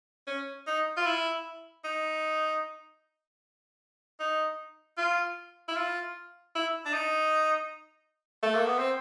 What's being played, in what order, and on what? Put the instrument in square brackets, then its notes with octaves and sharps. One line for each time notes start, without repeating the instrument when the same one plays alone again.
[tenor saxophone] C#4
D#4
F4
E4
D#4
D#4
F4
E4
F4
E4
D4
D#4
A3
A#3
B3
C4